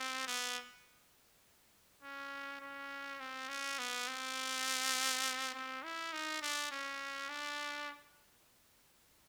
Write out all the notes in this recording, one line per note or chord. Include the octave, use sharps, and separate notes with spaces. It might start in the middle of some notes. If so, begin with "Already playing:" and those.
Already playing: C4
B3
C#4
C#4
C4
C#4
B3
C4
C4
E4
D#4
D4
C#4
D4